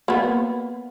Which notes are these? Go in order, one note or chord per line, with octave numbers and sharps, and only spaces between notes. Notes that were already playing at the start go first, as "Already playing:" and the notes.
A#3 B3